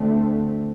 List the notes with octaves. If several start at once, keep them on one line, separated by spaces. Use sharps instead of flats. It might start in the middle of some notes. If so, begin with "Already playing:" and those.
Already playing: D2 D3 A3 C4